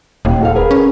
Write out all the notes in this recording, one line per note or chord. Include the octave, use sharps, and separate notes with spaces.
D#1 D#2
F#4 A4 F5
G#4 A#4 B4
C#4